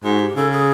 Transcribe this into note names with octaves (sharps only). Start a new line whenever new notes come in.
G#2 F#4
G4
C#3 A4
G#4